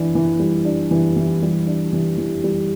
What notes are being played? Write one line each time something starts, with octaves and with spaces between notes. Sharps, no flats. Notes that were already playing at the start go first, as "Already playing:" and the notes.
Already playing: E3 D4
E3
G3
D4
E3
E3
G3
D4
E3
E3
G3